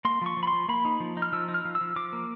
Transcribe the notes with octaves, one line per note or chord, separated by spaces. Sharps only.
A#3 C6
F3 C#6
F3
B5
C6
F3
A#3 B5
D#4
F3
D#4
F6
F3 E6
D#4
F6
F3
E6
F3
F3 D6
A#3